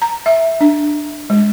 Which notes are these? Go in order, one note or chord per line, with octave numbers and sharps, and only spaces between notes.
A#5
E5
D4
G#3